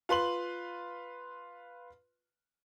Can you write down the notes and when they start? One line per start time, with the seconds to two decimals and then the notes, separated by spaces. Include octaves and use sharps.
0.09 F4 B4 C6 F#7